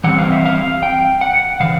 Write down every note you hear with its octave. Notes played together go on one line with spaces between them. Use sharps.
E3 G3 C4 F#5
F5
E5
F5
G5
F#5
C#3 E3 F5